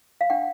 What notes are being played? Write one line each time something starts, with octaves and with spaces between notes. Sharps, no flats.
F5
D4 F#5